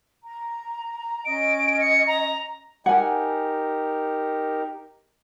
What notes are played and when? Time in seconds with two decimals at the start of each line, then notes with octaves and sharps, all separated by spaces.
0.24 A#5
1.25 C#4 D#5 D7
1.81 C#7
2.07 A#5
2.86 D#4 G4 A#4 F#5 G#5